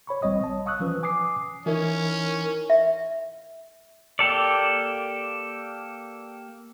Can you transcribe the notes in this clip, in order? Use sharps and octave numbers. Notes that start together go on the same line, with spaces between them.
C#5 B5 C#6
A1 G3 C4 C#5 D#5 D#6
A5
F5 C#6 D#6 E6 F#6
E3 F3 C#4 B4
G#5 D6 D#6 C7
E3 C#4 D#4 E4 A#4
E5
A#3 G4 A4 D5